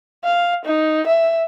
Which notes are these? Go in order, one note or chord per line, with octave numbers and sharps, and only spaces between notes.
F5
D#4
E5